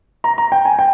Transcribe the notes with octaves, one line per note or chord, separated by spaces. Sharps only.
A#5
A#5
G5
G#5
G5